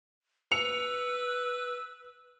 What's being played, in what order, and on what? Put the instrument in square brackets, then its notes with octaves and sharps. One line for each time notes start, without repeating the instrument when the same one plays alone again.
[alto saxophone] B4 [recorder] E6 [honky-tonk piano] C#7 F7